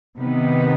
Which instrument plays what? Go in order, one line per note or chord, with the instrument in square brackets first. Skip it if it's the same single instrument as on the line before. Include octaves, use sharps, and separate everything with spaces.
[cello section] C3 D#3 B3 D#4 B4